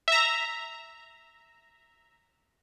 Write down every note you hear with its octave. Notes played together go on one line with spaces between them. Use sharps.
E5 A#5